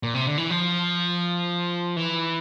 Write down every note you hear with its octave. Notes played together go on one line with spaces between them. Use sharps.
A#2
C3
D3
E3
F3
E3